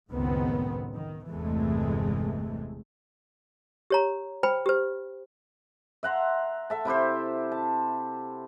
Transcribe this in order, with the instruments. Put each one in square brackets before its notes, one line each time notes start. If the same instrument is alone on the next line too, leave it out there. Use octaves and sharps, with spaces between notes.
[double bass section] F#1 C#2 A2 D#3 B3 C4
D#3
G1 E2 C3 E3 G#3 A3
[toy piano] G4 C#5 A#5
C5 G5 B5
G4 C5
[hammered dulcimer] E5 F#5 A#5 C6
A4 E5 A5
C3 E4 G4 C5
A5